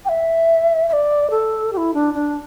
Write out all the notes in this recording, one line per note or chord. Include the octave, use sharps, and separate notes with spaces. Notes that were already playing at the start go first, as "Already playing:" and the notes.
G5
E5
E5
D5
A4
G4
E4
D4
D4